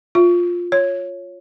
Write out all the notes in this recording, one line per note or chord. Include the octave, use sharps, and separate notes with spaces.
F4
C#5